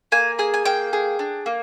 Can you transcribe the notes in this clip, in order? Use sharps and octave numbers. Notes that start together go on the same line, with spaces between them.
A#3 G#5
G#4 G#5
G#5
A#3 G5
G#4
D4
A#3